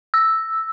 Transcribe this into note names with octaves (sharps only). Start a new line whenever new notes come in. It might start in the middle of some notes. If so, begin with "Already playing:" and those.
E6